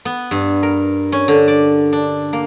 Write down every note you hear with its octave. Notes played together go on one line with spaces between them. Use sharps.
B3
G2
A#4
C#4
D3
D5
D4
A#3